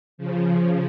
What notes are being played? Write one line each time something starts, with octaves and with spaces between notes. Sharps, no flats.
C#3 F3